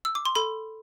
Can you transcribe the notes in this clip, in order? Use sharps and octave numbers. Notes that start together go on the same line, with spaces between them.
E6
D6
C6
A4 B5